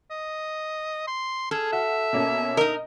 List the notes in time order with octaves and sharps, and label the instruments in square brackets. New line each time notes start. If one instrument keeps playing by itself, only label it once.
[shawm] D#5
C6
[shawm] G#4 [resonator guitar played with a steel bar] A4 [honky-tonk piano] F6
[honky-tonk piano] F#4 [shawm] E5
[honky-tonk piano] B2 A#3 C#4
[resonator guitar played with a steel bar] D#4 A#4 [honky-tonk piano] D#5